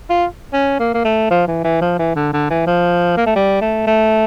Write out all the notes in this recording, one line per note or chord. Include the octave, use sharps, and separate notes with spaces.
F4
C#4
A#3
A#3
A3
F3
E3
E3
F3
E3
D3
D3
E3
F3
A#3
A3
G3
A3
A3